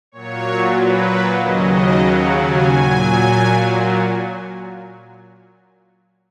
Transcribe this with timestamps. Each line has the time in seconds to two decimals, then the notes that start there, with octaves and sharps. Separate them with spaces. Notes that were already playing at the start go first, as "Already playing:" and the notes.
0.12 A#2 F#3 C#5
0.76 B4
1.40 D#2 C#3 F#3 D#5
1.73 D#5
2.05 F#5
2.37 G#5
2.69 A#2 F#3